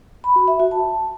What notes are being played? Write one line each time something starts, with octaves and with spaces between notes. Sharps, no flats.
B5
F#4
E5
F#4
A5